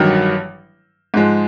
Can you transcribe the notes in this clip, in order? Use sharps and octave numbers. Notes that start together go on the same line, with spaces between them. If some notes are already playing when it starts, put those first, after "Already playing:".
Already playing: A1 G2 D#3 F#3
G#2 F3 G#3